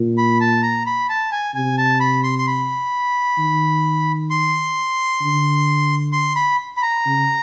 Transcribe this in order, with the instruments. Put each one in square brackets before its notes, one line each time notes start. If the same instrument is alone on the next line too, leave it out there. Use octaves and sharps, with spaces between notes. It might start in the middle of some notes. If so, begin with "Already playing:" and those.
Already playing: [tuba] A#2
[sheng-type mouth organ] B5
A5
A#5
B5
A5
G#5
[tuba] C3 [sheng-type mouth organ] G#5
[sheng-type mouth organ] A5
B5
C6
C6
B5
[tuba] D#3
[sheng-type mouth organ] C6
[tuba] D3
[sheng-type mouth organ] C6
B5
B5
A#5
[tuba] C#3